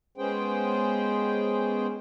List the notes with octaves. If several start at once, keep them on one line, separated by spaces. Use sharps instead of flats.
G#3 B3 C#4 G#4 C5 G5